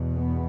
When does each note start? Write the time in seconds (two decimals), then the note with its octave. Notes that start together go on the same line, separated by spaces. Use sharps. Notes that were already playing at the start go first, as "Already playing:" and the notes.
Already playing: E2 B2
0.14 B3